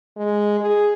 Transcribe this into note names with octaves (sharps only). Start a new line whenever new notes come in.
G#3
G#4